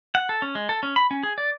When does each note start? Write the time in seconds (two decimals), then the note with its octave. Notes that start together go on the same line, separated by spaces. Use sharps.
0.15 F#5
0.29 A4
0.42 C#4
0.55 G#3
0.69 A4
0.83 C#4
0.96 B5
1.11 C#4
1.23 G#4
1.38 D5